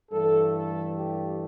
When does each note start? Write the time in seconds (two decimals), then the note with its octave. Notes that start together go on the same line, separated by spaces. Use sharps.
0.11 G2 E3 A3 A4
0.53 A4
0.95 G4